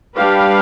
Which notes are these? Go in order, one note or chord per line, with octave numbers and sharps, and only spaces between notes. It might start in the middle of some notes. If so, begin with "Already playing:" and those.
G3 D4 G4 B4 F5